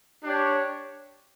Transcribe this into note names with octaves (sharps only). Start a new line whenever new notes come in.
D4 G4 C#5